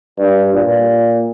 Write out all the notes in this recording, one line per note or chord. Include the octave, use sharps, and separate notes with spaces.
G2
A#2